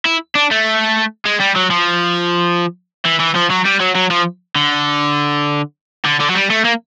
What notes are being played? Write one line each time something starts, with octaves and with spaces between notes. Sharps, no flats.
E4
D4
A3
G#3
G3
F#3
F3
E3
E3
F3
F#3
G3
F#3
F#3
F3
D3
D3
D3
F#3
G3
A3
A#3